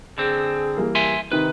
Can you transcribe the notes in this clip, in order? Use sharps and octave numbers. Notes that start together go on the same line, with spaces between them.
D3 C4 G#4
E3 G3 A#3
E5 G#5 C6
C3 D#3 D#4 B4